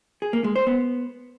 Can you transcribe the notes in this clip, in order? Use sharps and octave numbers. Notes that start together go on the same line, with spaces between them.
G#4
A#3
G#3
C5
B3